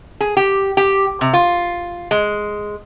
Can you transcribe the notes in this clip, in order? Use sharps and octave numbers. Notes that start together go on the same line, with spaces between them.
G#4
G4
G4
C3
F4
G#3